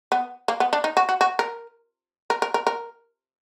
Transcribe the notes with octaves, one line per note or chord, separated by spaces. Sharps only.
B3
A#3
B3
D4
D#4
F#4
F#4
F#4
A#4
A#4
A#4
A#4
A#4